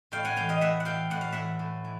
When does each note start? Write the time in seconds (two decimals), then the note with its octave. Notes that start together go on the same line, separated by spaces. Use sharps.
0.12 A2 F5 G5
0.25 F#5 G#5
0.36 E3 F5 G5
0.49 D#5 F5
0.61 A2 E5 F#5
0.80 F#5
0.85 E3 F5 G5
1.10 A2 F#5
1.21 F5
1.32 E3 E5 F#5
1.59 A2
1.84 E3